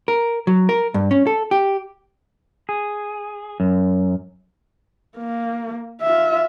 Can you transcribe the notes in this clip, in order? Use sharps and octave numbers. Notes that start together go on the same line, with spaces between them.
A#4
F#3
A#4
G2
C#4
A4
G4
G#4
F#2
A#3
F4 E5